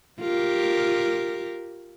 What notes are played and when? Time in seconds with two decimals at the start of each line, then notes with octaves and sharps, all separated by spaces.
0.21 F4 G4 A#4